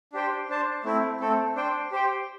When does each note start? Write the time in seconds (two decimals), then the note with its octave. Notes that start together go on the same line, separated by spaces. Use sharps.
0.13 D4 G4 C5 G5
0.49 D4 C5 A5
0.84 A3 C4 E4
1.20 A3 C4 A4
1.55 D4 C5 G5
1.92 G4 C5 G5